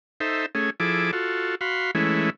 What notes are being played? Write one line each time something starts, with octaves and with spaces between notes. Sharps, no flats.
D#4 A4 C5 E5
A3 C#4 G#4
F3 E4 G#4 A4 D6
F4 F#4 A4
F#4 F5 B5 C6
E3 G#3 A3 C#4 E4